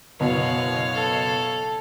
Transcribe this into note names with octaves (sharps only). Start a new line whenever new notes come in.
F#1 B2 B3 C#5 F5
A4